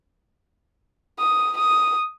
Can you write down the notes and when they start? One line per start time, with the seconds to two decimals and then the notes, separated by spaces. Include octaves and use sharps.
1.19 D#6
1.58 D#6